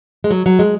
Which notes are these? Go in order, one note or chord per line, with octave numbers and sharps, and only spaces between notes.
G#3
F#3
F#3
G#3